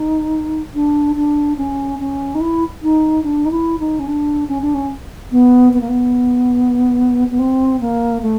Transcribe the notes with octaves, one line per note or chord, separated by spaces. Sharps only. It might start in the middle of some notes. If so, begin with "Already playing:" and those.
Already playing: D#4
D4
D4
C#4
C#4
D#4
E4
D#4
D4
D#4
E4
D#4
C#4
D4
C#4
D4
C#4
B3
B3
A#3
B3
B3
C4
A#3
A3